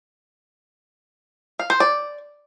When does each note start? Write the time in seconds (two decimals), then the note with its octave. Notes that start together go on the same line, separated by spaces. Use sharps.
1.59 F5
1.70 C5
1.80 D5